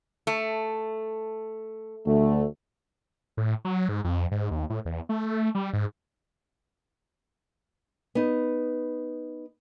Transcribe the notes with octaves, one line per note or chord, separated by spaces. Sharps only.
A3
D2 A3
A2
F#3
G#2
F2
G#2
D#2
A2
E2
A3
A3
G3
G#2
B3 D#4